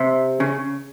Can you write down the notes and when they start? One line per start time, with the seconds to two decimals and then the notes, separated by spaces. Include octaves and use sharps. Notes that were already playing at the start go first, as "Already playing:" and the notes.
Already playing: C3
0.40 C#3